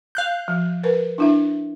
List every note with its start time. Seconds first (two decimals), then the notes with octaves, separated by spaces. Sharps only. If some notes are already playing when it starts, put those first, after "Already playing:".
0.15 F5 F#6 G6
0.48 F3
0.83 A#4 B4
1.18 D4 E4 E5